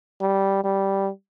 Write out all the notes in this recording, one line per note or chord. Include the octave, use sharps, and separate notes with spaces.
G3
G3